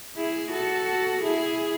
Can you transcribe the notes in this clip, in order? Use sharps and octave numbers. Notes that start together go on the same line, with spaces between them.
E4 G#4
F#4 A4
E4 G#4